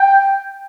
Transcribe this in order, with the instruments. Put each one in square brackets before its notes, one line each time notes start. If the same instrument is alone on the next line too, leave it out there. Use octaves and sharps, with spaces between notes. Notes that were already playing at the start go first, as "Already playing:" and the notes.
Already playing: [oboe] G5